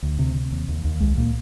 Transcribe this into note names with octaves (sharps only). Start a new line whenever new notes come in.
D2
C3
C3
D#2
D#2
D#2
C2 G#3
A#2 A#3